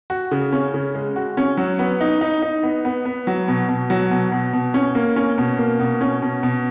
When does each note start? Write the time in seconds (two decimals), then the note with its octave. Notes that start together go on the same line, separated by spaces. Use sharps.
0.10 F#4
0.31 C#3
0.52 C#4
0.74 C#3
0.95 G#3
1.16 F#4
1.37 C#4
1.57 F#3
1.79 B3
2.01 D#4
2.21 D#4
2.42 D#4
2.63 B3
2.85 B3
3.05 B3
3.27 F#3
3.48 B2
3.68 B2
3.90 F#3
4.11 B2
4.32 B2
4.53 B2
4.74 C#4
4.95 A#3
5.16 C#4
5.38 B2
5.58 A#3
5.80 B2
6.01 C#4
6.22 B2
6.43 B2